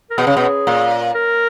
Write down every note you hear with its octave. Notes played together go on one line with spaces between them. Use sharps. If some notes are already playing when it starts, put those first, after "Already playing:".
A#4
B2 G#4
C#3
B2
A#2
A#4